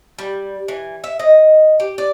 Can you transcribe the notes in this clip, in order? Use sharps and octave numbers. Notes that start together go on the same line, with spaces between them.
G3
E3
E5
D#5
G4
D5